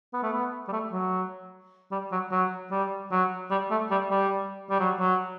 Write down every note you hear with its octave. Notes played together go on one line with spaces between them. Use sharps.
B3
A3
B3
G3
A3
F#3
G3
F#3
F#3
G3
F#3
G3
A3
G3
G3
G3
F#3
F#3